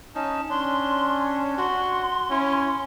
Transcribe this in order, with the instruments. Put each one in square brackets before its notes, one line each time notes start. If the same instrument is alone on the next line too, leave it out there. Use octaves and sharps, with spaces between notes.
[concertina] C#4 D#4 [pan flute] A5
[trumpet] C#4 [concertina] D4 [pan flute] C6
[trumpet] F#4 [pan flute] C6
[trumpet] C#4 [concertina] E4